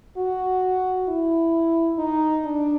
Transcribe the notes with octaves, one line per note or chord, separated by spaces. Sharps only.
F#4
E4
D#4
D4